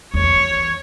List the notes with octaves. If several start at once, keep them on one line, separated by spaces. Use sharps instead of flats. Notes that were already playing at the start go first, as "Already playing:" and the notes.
E2 C#5